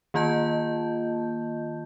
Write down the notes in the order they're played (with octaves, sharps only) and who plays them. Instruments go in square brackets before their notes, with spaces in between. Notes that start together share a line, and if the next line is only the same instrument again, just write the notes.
[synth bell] D#3 A#3 F4 D#5 A5 G6